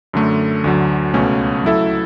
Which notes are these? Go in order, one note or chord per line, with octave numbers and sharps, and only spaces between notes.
F#2 D3 A3
D2 D3 F#3
C#2 B2 A3 C#4
F#3 A3 E4 A4 E5